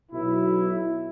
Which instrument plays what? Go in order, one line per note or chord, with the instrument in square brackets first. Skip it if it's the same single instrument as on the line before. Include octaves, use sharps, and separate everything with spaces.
[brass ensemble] B1 B2 F#3 E4